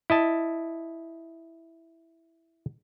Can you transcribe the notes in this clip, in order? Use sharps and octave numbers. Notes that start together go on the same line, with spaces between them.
E4 D#5 A5